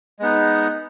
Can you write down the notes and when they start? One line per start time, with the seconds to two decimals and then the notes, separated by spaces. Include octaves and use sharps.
0.19 G#3 B3 D#4